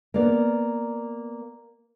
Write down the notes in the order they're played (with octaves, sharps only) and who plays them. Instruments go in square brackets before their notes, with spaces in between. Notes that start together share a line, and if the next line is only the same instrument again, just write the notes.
[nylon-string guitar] A#3 B3 D5